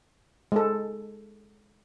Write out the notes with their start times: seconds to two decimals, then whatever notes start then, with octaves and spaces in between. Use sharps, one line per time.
0.52 G#3 A4